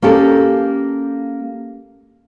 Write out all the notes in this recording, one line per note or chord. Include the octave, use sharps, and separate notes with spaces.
A#3 C#4 G4 A4